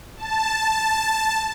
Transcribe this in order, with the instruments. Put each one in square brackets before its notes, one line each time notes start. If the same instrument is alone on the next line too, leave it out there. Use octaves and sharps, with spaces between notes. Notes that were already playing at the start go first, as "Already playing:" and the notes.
[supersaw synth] A5